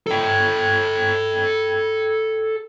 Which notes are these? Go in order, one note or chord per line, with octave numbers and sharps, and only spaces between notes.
A4 G5